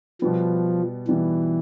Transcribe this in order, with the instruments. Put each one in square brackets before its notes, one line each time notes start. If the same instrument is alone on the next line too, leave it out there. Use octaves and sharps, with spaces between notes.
[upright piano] B2 G3 B3 [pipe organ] F3
[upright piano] B2 G3 B3 [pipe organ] E3